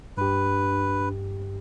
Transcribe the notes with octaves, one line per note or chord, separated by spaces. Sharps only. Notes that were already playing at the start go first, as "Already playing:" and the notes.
G2 D4 G4 B4